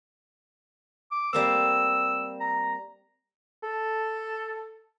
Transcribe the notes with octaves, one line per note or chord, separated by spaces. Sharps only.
D6
G3 A#3 C4 E6
A#5
A4